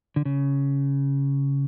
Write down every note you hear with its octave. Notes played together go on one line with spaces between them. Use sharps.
D3
C#3